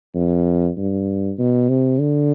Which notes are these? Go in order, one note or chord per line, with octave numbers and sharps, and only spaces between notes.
F2
G2
B2
C3
D3